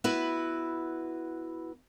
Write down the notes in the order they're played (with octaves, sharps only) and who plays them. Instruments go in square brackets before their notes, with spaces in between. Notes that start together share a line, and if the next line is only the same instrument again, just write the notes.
[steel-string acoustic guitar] B3 E4 F#4 B4